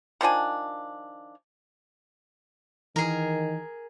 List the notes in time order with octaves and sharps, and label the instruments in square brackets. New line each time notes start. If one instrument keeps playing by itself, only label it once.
[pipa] D#3 F3 D4 G#5
[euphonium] D#3 [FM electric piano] E3 [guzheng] G#4 A#4